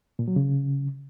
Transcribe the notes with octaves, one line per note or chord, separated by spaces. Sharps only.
A#2
F#3
C#3